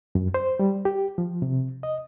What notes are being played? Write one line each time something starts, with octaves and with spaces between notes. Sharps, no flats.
F#2
C5
G3
G4
F3
C3
D#5